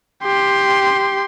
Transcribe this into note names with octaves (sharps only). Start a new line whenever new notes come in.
G4 C6